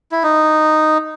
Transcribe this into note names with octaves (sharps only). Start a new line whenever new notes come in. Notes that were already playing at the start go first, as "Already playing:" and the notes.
E4
D#4